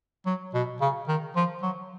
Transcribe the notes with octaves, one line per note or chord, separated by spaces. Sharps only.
F#3
B2
C#3
D#3
F3
F#3